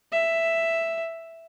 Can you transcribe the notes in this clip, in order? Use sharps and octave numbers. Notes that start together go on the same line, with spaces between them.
E5